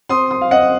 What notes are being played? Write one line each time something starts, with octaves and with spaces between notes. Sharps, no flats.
C4 C6 D#6
C6 D#6
F5
C4 D#5 F#5